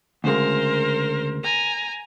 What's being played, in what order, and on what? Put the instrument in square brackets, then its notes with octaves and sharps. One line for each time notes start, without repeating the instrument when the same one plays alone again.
[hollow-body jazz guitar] D2 C#3 G#3 [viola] A#4 C5
[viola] G#5 A#5